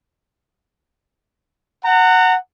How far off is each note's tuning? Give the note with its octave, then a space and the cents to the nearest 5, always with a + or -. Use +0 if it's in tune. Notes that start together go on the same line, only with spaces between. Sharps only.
F#5 +0 A#5 -35